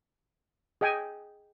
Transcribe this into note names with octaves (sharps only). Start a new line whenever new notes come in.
G#4 D#5 G5 G#5